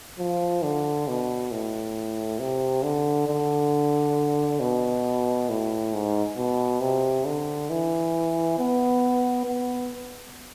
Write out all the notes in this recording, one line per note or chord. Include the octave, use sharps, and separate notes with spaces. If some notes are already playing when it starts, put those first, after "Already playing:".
F3
D3
B2
A2
C3
D3
D3
B2
A2
G#2
B2
C3
D3
E3
B3
B3